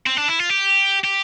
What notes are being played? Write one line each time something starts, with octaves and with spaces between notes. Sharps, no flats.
C4
D4
E4
F4
G4
G4